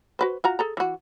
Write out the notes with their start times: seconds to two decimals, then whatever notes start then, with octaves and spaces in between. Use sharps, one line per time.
0.19 F#4 B4 C5
0.44 F4 F#4 A#5
0.59 G#4 A4 A#5
0.77 E3 F#4